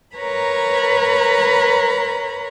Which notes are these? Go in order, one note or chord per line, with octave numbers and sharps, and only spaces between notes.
A#4 B4 C#5 A#5 B5